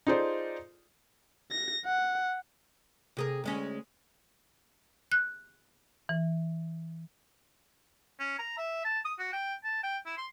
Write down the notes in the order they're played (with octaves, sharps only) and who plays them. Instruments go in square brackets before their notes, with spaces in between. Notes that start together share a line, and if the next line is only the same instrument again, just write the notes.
[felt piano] D#4 F4 G#4 A4 C5 D5
[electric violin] A#6
F#5
[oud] C3 G#4 A#4
D2 G#3 C#4
[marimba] F#6
E3
[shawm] C#4
A#5
E5
A5
D#6
F#4
G5
A5
G5
E4
C6